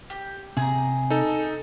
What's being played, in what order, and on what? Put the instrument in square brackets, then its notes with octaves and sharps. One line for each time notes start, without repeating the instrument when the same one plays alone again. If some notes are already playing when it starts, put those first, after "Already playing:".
[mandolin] G4
[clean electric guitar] C3 [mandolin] G#4 A#5
[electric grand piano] D#4 A4